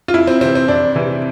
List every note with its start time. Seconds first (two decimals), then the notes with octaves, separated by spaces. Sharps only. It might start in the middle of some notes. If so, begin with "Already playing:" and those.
0.08 F4
0.14 F2 E4
0.27 C4
0.41 C3 E3 C4
0.55 C4
0.68 F2 D4
0.96 C3 E3